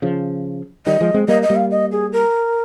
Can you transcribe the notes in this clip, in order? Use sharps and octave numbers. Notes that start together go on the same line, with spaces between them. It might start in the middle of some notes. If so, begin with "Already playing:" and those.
C#3 F3
D#3 G3 D#5
F3 G#3
G#3 C4
G3 A#3 D#5
D#5
G3 A#3
F5
D#5
G#4
A#4